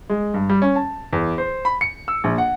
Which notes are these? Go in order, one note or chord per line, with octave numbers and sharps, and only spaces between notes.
G#3
G2
G3
C#4
A5
E2
C5
B5
C#7
E6
A#1
F#5